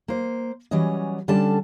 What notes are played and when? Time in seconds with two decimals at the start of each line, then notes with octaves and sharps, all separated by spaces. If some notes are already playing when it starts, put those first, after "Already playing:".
0.08 A#3 C5
0.71 E3 F#3 G3 C#4 D#5
1.28 D3 G3 C#4 D4 A4 A5